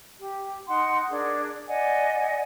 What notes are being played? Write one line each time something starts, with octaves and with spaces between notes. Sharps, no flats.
G4
D#4 F#5 C6
D4 G#4 A#4
D5 D#5 F#5 G#5